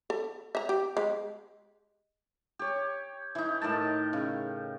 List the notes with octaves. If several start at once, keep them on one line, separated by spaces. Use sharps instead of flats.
A4
E5 A#5
G4
G#3 G4
G4 C#5
E3 D#4
A2 D#3 A#4 A5
C#3